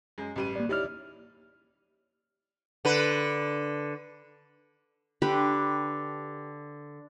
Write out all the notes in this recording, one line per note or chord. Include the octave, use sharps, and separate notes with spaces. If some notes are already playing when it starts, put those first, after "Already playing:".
F#2 G#3
A1 G3 D#7
A#3 D5
D#4 E4 G4 C#5 D5 F6
D3 B4
D3 G4 B4 B5